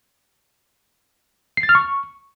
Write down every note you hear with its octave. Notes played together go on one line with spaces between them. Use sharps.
C7
A6
F6
C#6